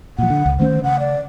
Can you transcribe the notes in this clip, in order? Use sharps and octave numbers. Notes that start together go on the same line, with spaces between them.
A#2 F3 F#5
D3
C#2
D#3 A3 C#4 C5
C#3 F#5
D5